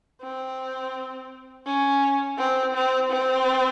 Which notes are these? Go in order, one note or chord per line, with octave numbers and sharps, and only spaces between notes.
C4
C#4
C4
C4
C4